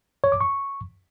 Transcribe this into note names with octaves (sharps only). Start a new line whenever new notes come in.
C#5
D6
C#6